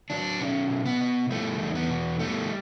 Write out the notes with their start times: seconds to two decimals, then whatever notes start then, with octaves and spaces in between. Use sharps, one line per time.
0.10 F#3 D4
0.40 B2 C#4
0.70 B2
0.86 B3
1.01 B2
1.30 G3 A3
1.59 E2
1.75 B3
1.90 B2
2.19 G3 A3